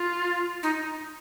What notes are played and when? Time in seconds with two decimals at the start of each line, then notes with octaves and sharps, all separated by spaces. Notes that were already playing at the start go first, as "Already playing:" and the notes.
Already playing: F4
0.63 D#4